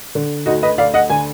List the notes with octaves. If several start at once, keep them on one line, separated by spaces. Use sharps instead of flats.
D3
D2 D#4 F#4
B4 D#5
D2 D5 F5
D#5 F#5
D3 G#5